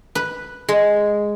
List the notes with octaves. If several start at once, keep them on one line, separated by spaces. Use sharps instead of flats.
B4
G#3